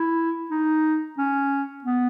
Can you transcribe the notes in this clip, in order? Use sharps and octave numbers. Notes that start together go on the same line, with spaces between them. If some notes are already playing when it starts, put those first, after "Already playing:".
Already playing: E4
D#4
C#4
B3